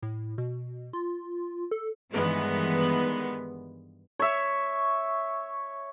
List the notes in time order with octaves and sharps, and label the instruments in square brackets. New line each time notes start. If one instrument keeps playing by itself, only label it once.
[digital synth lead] A2
B2
F4
A4
[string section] G2 D#3 E3 G#3 B3
[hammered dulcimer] C#5 E5